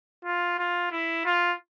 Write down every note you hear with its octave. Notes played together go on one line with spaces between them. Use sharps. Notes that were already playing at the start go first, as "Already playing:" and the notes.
F4
F4
E4
F4